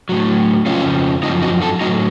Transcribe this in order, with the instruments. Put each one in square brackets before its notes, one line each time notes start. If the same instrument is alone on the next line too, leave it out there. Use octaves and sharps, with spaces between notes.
[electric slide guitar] A2 F#3
F2 C#3 F3 C#4 F4
F#2 F3 C4 D#4
D#4 F#4
F4 A4
A2 F#3 D#4 F#4